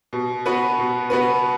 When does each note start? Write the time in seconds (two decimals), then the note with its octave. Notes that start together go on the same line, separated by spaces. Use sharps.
0.13 B2
0.46 B3 F#4 B4
0.79 B2
1.10 B3 F#4 B4